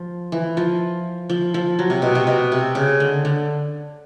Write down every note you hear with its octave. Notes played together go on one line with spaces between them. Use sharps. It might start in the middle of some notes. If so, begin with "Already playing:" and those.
Already playing: F3
E3
F3
F3
F3
F#3
C3
B2
C3
B2
C3
C#3
D3
D3